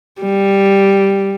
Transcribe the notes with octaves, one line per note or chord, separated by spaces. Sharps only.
G3